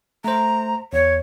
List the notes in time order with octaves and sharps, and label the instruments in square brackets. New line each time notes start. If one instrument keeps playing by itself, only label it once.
[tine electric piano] A3 C5 [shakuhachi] A#5
[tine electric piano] E2 [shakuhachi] C#5